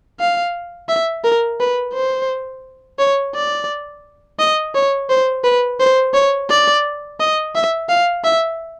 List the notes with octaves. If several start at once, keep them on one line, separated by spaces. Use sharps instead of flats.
F5
E5
A#4
B4
C5
C#5
D5
D#5
C#5
C5
B4
C5
C#5
D5
D#5
E5
F5
E5